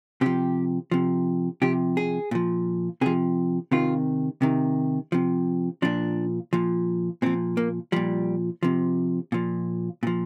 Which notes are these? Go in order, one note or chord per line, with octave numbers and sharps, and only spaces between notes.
C3 F3 G4
C3 F3
C3 F3 G4
G#4
A#2 F3
C3 F3 G#4
C3 D#3 F4
C3 D#3
C3 F3
A#2 F3 D4
A#2 F3
A#2 F3 C4
A#3
A#2 F3 G3
C3 F3
A#2 F3
A#2 F3